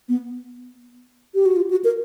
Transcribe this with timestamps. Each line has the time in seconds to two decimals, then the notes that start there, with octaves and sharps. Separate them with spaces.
0.09 B3
1.35 G4
1.46 F#4
1.56 F4
1.71 F#4
1.84 A#4